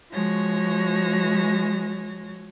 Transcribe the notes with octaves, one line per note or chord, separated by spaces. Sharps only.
F3 G#3 F#4 C#5 A#6